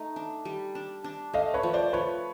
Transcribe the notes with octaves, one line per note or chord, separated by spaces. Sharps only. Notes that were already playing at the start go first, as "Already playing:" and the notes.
Already playing: A3 D#4
D4
G3
D4
D4
A3 D#5 F5
B4 C#5
F3
C5 D5
F3 B4 C#5